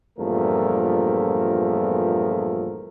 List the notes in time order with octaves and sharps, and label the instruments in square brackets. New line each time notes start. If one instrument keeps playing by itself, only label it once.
[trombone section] E2 G2 A#2 F3 A3 A#4